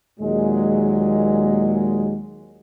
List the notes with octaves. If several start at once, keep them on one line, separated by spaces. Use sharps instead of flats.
D#2 A#2 F#3 G#3